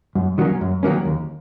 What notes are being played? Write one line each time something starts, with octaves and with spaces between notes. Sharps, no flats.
F#2
D#3 F#3 A#3 C#4
F#2
D#3 F#3 A#3 C#4
D#2